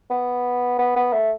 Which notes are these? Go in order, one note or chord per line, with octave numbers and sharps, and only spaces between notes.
B3
B3
B3
A3